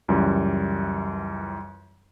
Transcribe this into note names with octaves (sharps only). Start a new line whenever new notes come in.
C#2 F#2 E3 G3